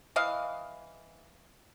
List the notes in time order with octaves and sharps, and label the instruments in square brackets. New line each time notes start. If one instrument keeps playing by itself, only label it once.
[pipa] E3 D#5 F5